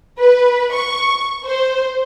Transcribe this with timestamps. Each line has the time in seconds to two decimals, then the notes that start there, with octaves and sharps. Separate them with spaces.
0.19 B4
0.73 C#6
1.45 C5